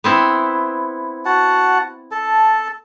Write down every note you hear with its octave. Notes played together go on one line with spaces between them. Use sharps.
B3 C4 E4
F#4 F#5 A5
A4 A5